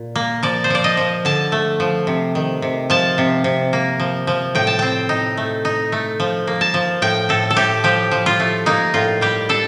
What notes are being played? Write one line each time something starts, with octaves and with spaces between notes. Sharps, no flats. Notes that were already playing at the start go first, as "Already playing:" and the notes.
Already playing: A#2
A#3
F3 D5
C5
F3 D5
D#5
F3
D3 A5
A3
F3
C3
D#3
C3
F3 A5
C3
C3
A#3
F3
F3
A2 G5
A5
C4 G5
D#4
A3
D#4
A3
F3
A#3
A5
F3
A2 G5
A2 A4
A4
A2 G4
F3 G4
F3
F4
A3
A#3 D#4
A2 F4
G3 G4
D4 A4